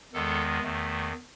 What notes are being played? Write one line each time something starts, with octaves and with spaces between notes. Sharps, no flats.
E2 D#3 G#3 B3 A4
E2 D#3 A3